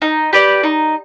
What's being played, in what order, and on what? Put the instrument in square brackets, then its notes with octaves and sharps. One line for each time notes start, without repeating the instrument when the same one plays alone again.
[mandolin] D#4
G4 B4 D5
D#4